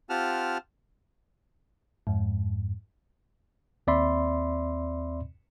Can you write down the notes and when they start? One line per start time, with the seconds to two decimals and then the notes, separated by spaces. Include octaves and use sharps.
0.10 C4 F4 G4 F#5 A5 F6
2.07 F2 G#2
3.87 D#2 C4 D5 E5 B5 C6